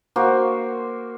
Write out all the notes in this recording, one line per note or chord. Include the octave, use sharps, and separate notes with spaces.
A#3 F#4 C5